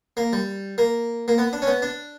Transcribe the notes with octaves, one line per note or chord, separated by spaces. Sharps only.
A#3
G3
A#3
A#3
B3
D4
C#4
B3
D4